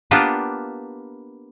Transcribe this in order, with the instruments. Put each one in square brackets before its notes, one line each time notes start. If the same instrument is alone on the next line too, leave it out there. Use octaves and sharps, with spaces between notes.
[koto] A#3 B3 D4 F4 G4 B4